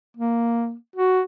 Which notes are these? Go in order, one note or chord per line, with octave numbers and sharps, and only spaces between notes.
A#3
F#4